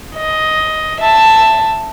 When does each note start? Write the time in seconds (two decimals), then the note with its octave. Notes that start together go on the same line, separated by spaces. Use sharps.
0.17 D#5
1.00 E5 A5